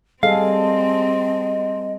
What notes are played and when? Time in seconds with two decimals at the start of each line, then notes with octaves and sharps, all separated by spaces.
0.23 G3 C4 G#4 A4 D#5 F5